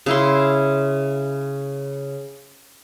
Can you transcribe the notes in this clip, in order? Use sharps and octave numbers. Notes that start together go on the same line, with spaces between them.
C#3 E4 C6